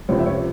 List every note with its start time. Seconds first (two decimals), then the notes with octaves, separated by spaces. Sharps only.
0.09 C#2 C3 F3 C4 C#5
0.19 E5
0.26 C#5